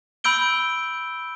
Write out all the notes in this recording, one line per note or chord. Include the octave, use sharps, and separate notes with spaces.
B5 E6 G6 D7 G7